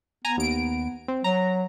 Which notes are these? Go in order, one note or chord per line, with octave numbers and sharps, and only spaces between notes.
B3 G#5 A#5
D#2 D7
C4
F#3 A#5